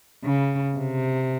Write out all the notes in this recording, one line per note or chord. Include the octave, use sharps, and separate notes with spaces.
C#3
C3